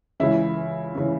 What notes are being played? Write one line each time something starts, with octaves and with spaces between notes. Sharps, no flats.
C#2 C#3 E3 E4
C#3 E3